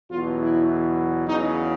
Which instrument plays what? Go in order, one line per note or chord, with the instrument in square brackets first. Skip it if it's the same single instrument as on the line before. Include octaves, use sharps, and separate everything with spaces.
[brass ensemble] E2 B2 F#3 F4
E4
E2 C#3 F#3 D#4